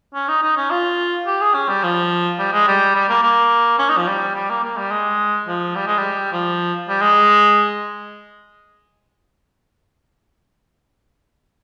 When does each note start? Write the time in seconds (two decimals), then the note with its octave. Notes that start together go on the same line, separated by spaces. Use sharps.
0.14 C#4
0.28 D#4
0.43 D#4
0.57 C#4
0.70 F4
1.26 G4
1.41 G#4
1.54 C#4
1.69 G3
1.83 F3
2.39 G3
2.53 G#3
2.68 G3
2.95 G3
3.09 A#3
3.23 A#3
3.79 C#4
3.89 D#4
3.97 F3
4.07 G3
4.35 G3
4.50 A#3
4.63 A#3
4.77 G3
4.91 G#3
5.48 F3
5.75 G3
5.87 G#3
5.98 G3
6.32 F3
6.88 G3
7.01 G#3